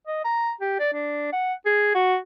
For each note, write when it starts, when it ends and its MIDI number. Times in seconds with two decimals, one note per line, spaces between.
0.07 0.22 75
0.25 0.52 82
0.61 0.78 67
0.80 0.92 74
0.93 1.29 62
1.33 1.54 78
1.66 1.91 68
1.95 2.17 66